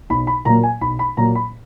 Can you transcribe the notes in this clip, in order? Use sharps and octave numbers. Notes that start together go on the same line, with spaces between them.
B1 B5
B5
A#2 F#3 A#3 A#5
G#5
B1 B5
B5
A#2 F#3 A#3 A#5
B5